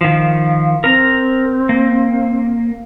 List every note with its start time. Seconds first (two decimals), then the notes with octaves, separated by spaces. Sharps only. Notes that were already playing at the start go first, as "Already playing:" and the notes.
0.01 D#3 F3 F5
0.84 C4 A#4 A#5
1.69 A#3